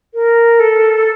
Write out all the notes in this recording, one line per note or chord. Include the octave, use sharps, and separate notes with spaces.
A#4
A4